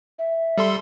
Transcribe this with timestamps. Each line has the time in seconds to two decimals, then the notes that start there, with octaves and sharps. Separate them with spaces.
0.19 E5
0.58 G3 A4 C6